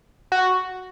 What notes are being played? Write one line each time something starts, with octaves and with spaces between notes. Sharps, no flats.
F#4